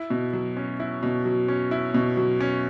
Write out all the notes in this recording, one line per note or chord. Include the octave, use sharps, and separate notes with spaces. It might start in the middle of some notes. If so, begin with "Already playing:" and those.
Already playing: E4
B2
F#3
C#4
E4
B2
F#3
C#4
E4
B2
F#3
C#4